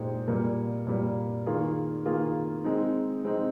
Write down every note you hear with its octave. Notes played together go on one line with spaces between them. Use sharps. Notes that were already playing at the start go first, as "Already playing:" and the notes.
Already playing: A#2 G#3 D#4 G4 C5
A#2 G3 A#3
A#2 G3 A#3
D#3 A#3 F4 G#4
D#3 A#3 F4 G#4
G#3 C4 D#4
G#3 C4 D#4